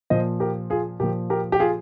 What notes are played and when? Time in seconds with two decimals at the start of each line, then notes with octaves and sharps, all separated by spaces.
0.10 A#2 F3 C5 D#5
0.40 G4 A#4
0.70 F4 G#4
1.00 A#2 F3 G4 A#4
1.30 G4 A#4
1.52 G4
1.59 F4 G#4